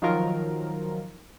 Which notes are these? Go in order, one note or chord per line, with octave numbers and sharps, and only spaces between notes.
D#3 F3 F#3 F4 A#4